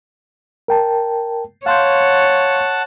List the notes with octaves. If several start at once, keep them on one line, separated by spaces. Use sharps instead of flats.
A#4 G5 A5
C#5 F5 F#5 A5 C6 G6